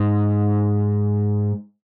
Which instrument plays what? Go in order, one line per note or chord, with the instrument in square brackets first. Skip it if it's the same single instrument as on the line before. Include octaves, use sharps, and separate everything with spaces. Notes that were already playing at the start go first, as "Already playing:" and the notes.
Already playing: [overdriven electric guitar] G#2